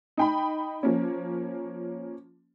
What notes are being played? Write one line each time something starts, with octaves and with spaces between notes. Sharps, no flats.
D#4 G5 B5
F3 A#3 C#4